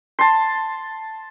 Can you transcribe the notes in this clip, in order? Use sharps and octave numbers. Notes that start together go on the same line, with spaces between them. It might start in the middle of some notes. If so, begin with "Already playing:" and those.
A5 C6